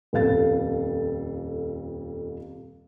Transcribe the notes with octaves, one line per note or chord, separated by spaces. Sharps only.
D#1 F2 A4 F5 A6